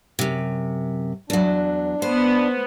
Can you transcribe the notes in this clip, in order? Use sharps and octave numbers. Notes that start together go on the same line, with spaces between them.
F#2 C3
E2 F#3 D4
B3 C5